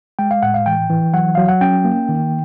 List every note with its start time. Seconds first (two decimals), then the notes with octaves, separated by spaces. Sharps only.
0.19 G#3 G5
0.31 F5
0.43 A2 F#5
0.54 F5
0.66 E3 G5
0.90 E3
1.14 F#3 F#5
1.35 F#3 F5
1.48 F#5
1.61 C#4 G5
1.85 A#3
2.09 D#3